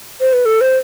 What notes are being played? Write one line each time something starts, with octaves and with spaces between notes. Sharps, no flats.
C5
B4
A4
C5